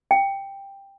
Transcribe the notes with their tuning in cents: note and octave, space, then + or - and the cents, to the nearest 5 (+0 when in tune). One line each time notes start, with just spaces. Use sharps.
G5 +10